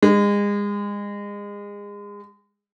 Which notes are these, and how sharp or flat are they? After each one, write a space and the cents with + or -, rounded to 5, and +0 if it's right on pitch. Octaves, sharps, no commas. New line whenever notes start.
G#3 -30